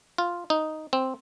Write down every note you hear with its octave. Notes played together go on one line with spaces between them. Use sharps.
F4
D#4
C4